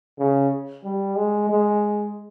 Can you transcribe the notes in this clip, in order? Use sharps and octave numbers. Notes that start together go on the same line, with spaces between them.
C#3
G3
G#3
G#3